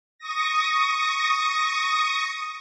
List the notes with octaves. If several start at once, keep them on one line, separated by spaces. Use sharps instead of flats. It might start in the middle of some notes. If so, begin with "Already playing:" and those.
C#6 D#6 A#6